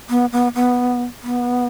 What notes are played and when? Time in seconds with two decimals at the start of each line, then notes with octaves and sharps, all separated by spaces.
0.10 B3
0.32 B3
0.55 B3
1.23 B3